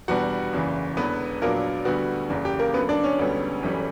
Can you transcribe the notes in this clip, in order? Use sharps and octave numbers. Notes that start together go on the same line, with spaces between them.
E2 B2 G3 B3 D4 F#4 F#5
F#1 E2 C#3 E3
E1 E2 D3 B3 B4
A#1 A#2 F#3 A#3 B3 D4 A#4
D2 D3 G3 B3 F#4
F#1 E2 C#3
G4
A#3 A#4
F#2 D3 A#3 B3 B4
D4 D5
C#4 C#5
E1 D2 D3 G3 B3
G1 F#2 E3 G3 C#4